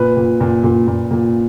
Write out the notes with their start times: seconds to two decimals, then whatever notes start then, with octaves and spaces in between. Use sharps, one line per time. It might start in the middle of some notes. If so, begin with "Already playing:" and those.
Already playing: A#2 B4
0.17 A#2
0.41 A#2
0.64 A#2
0.87 A#2
1.11 A#2